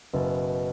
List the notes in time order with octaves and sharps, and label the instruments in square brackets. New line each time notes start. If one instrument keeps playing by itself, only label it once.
[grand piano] F#1 [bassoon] B2